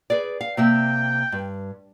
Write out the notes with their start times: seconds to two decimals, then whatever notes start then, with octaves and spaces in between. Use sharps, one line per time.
0.10 G#4 B4 D5
0.41 F5
0.57 C3 A#3 E5 G5
1.32 G2